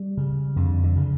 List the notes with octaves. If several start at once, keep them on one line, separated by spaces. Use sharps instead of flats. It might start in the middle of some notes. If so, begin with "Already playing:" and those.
Already playing: G3
C#3
F2 D3
D3
C#3